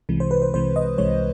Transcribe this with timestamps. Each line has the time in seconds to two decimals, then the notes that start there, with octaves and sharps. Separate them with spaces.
0.09 C2 C3 E3 G#3
0.20 C5
0.31 B4
0.42 C5
0.53 C2 C3 E3 G#3 C5
0.76 D#5
0.98 C2 C3 E3 G#3 C#5